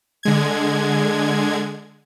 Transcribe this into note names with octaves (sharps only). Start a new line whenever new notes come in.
D3 G#3 G#6